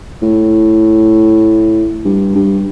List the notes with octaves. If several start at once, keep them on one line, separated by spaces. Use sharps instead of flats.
A2
G2
G2